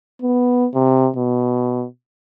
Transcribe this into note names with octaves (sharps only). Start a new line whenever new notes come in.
B3
C3
B2